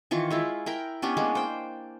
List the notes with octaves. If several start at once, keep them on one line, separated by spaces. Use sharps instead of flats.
D#3 E3 F4 C#6
G#3 E4 F4
E4 A#4 G5
B3 C#4 D4 G4
G#3 A#3 B3
C5 G5